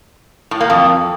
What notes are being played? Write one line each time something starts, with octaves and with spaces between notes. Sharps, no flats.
A2
A#3
F2